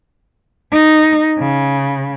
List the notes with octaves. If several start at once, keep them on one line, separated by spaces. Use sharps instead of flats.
D#4
C#3